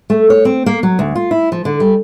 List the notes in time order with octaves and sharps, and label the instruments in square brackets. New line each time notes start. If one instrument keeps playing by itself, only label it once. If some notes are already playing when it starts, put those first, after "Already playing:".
[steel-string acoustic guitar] A3
C#5
C4
A#3
F#3
D2
F4
E4
F3
D3
G3